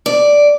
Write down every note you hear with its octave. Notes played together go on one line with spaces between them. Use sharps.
D5